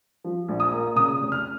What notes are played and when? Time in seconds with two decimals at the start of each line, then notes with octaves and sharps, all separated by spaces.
0.24 F3
0.49 A#1
0.60 D#6
0.72 A#3
0.96 C#3 D#6
1.21 F1
1.32 F6